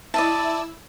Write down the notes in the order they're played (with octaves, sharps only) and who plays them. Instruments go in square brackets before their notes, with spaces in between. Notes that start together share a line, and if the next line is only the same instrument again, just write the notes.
[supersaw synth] E4 E6 [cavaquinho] D5 D#5 A5